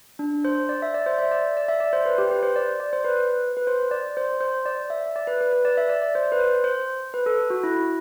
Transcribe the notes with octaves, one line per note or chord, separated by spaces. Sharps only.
D4
C5
D5
E5
D5
C5
E5
D5
D5
E5
D5
C5
B4
G4
B4
C5
D5
D5
C5
B4
B4
C5
D5
C5
C5
D5
E5
D5
B4
B4
B4
D5
E5
D5
D5
C5
B4
C5
C5
B4
A4
F#4
E4